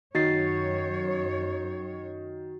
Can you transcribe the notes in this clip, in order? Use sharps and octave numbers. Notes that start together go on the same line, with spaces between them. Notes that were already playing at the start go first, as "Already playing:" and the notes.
F#2 D#3 F#4 C#5 A6 C7